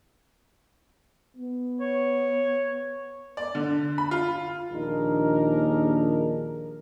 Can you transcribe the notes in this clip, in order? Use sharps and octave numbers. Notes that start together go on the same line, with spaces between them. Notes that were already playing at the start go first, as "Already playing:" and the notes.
B3
C#5
D5
D3
B5
F4
A#1 D#2 D4 D#4 G#4 A#4